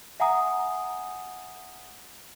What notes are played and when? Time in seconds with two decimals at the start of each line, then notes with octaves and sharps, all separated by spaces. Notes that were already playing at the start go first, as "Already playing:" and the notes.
0.20 E5 F#5 G#5 A#5 D#6